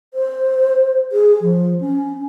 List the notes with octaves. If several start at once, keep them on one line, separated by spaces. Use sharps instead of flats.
C5
G#4
F3
C#4